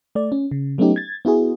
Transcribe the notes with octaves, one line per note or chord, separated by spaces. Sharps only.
A3 D5
C#4
C#3
F#3 A3 B3 C#4 D#4 G4
G#6 A6
B3 E4 F#4 G#4